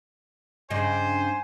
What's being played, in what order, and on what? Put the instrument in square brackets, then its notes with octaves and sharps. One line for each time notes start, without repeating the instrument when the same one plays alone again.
[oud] G2 C#3 D#4 [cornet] C5 [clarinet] G#5